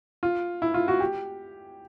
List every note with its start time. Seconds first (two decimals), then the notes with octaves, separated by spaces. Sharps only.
0.23 F4
0.62 E4
0.74 F4
0.88 F#4
1.00 G4